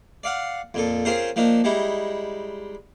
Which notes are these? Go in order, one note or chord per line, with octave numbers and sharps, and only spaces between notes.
D5 F5 F#5
F2 A#2 A4
C4 C#4 F4 G#4 A#4 C5
F3 A#3 D4 D#4
G3 G#3 D#4 E4